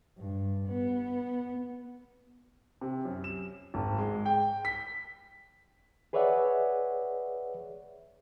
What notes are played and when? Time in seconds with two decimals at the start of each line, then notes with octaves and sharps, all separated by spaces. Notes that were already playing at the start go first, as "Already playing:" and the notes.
0.18 G2
0.69 B3
2.81 C3
3.05 F#2
3.24 E7
3.74 G#1
3.98 G#3
4.26 G5
4.65 B6
6.13 G#4 B4 C#5 D5 E5 F#5